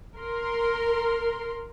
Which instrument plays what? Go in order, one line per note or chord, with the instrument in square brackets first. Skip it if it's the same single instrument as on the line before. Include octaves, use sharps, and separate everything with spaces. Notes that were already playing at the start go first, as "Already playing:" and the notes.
[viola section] A#4 C6